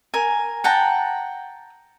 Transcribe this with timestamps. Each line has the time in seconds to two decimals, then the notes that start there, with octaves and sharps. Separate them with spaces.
0.14 A#4 G#5
0.64 F#5 G5 A5 A#5